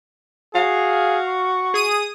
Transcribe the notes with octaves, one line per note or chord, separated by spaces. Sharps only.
F#4 G#4 F5
C#6
G#4 D#6 D#7